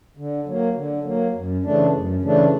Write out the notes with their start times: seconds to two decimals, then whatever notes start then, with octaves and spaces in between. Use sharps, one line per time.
0.17 D3
0.46 F#3 A#3
0.76 D3
1.04 F#3 A#3
1.34 F#2
1.63 C#3 E3 A3 D4
1.93 F#2
2.22 C#3 E3 A3 D4